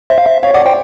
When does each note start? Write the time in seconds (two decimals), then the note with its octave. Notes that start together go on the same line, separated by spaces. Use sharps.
0.10 C5 E5
0.18 F5
0.26 E5
0.43 C#5 F5
0.54 D5 F#5
0.65 C5 G5